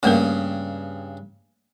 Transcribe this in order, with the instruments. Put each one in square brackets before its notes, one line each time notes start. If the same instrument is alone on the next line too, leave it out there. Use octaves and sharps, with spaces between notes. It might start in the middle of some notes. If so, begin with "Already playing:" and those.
[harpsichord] G2 C#3 [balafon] A3 A#3 A#4